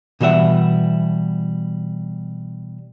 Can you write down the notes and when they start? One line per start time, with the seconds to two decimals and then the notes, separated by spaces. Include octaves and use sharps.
0.20 B2 E3 G3 E5 F#5